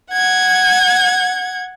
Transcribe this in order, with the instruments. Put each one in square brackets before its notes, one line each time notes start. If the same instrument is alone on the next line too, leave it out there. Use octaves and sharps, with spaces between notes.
[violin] F#5 G#6